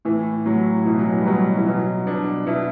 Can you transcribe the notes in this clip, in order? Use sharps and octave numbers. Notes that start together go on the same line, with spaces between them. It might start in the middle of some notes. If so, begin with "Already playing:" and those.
A2 E3
A2 F#3
B2 E3
F#3
E3
G3
B2 F#3
E3
B2 F#3
B2 D4
B2 E4